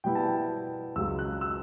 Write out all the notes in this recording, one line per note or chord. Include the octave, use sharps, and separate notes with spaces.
B2 G3 B3 E4 G5
A5
G5
C#2 C#3 F#3 E6
F#6
E6